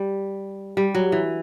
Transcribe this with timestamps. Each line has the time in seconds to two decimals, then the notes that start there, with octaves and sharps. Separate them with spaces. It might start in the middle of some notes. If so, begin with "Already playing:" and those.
Already playing: G3
0.77 G3
0.95 F#3
1.12 E3